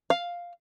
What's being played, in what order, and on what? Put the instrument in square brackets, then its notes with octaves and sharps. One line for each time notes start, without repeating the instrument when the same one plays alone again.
[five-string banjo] F5